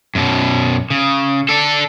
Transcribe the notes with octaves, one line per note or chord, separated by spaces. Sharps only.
F#2 B2
C#3
D4 A4